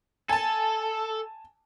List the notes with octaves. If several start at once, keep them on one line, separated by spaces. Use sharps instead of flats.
A4 G#5 A5